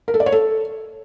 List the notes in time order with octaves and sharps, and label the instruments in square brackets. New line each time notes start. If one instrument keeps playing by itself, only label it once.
[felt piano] A#4
A4
D5
C#5
A4